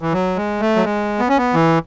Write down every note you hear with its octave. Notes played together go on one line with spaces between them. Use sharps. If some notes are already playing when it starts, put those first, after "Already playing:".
E3
F#3
G#3
A3
F#3
G#3
B3
C#4
B3
E3